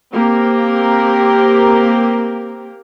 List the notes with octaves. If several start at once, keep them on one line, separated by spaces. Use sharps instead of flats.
A#3 C4 G4 A#4